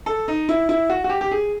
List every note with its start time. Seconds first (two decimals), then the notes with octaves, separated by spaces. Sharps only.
0.06 A4
0.28 D#4
0.49 E4
0.69 E4
0.90 F#4
1.04 F#4
1.10 G4
1.21 G4
1.31 G#4